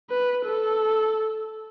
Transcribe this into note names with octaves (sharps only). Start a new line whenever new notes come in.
B4
A4